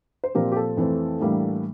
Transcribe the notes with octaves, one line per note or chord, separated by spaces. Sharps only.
C5
A#2 F3 C4 G4 A#4
G4
A4
F2 E3 A3 C4
A2 E3 G3 A#3 D4